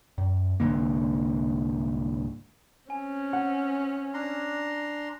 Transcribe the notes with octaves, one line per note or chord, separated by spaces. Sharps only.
F#2
C2 G#2 D3 A#3
C4 C#4 G#5
F#5
D4 A#5 C6